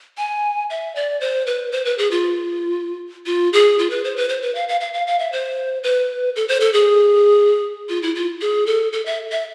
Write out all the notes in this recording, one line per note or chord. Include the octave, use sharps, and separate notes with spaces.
G#5
E5
D5
C5
B4
C5
B4
G#4
F4
F4
G#4
F4
B4
C5
B4
C5
B4
F5
F5
F5
F5
F5
E5
C5
B4
A4
C5
A4
G#4
F4
E4
F4
G#4
A4
A4
E5
E5